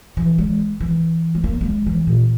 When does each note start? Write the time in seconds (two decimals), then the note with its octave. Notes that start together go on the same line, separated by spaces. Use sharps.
0.17 E3
0.38 G#3
0.81 E3
1.35 G#3
1.44 A#3
1.61 G3
1.65 G#3
1.86 E3
2.07 A#2